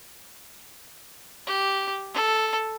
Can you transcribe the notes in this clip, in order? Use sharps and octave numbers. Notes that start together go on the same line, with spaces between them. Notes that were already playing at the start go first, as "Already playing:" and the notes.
G4
A4